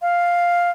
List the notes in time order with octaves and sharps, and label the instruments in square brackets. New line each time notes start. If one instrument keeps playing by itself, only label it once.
[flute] F5